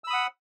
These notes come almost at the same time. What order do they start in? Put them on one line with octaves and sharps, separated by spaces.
E6 B5 D#6 F#5